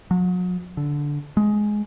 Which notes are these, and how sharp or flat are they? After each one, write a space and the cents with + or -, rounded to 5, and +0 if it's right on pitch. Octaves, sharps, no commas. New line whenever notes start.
F#3 -40
D3 -10
G#3 +10